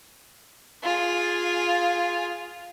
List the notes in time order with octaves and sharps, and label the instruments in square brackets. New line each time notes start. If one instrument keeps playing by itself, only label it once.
[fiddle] F4 G#4